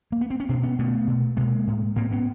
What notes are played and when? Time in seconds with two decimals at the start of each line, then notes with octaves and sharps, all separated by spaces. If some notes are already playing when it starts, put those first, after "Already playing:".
0.12 A#3
0.21 B3
0.30 C4
0.40 C#4
0.49 B2 C4 D4
0.63 B3 C#4
0.79 B2 A3 B3
1.07 B2
1.37 B2 G#3 A#3
1.67 A2
1.96 A2 A#3 C4
2.11 B3 C#4